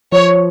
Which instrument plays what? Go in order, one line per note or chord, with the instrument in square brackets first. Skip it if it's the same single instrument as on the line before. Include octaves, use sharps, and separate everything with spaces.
[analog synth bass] F3 [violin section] C#5